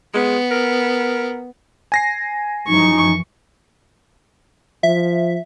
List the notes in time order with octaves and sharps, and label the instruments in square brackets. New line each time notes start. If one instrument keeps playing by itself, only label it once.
[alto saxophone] G#3 [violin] B3
[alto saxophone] A#4
[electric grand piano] G#5 A#6 C7
[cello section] F#2 E3 F3 [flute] D#4 [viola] C#6
[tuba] F3 [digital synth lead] E5